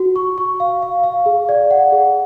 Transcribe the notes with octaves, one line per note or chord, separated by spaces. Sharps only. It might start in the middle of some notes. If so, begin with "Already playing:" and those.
Already playing: F#4
C#6
C#6
F5
F5
F5
G#4
D5
F#5
G#4